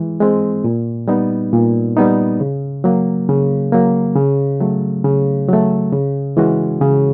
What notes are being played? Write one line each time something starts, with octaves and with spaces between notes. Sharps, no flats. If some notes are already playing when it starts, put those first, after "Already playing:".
Already playing: E3 G#3
G#3 C4
A#2
G3 B3 D#4
A#2
G3 B3 D#4
C#3
F#3 A#3
C#3
F#3 A#3
C#3
F#3 A3
C#3
F#3 A3
C#3
E3 G#3 C#4 F#4
C#3